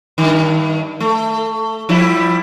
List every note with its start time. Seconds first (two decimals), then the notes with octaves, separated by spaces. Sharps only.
0.18 G2 D#3
1.00 A3
1.89 F3 G3 E4